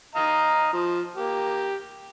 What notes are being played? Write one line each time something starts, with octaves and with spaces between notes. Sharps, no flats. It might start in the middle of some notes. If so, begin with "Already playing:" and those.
D#5 F5 A#5
F3
A#3 G4